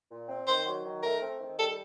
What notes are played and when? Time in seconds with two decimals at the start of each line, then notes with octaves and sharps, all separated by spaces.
0.10 A#2
0.28 C4
0.47 D#3 C5
0.65 F#3
0.84 D#3
1.03 A3 A#4
1.22 C4
1.40 D#3
1.59 G3 A4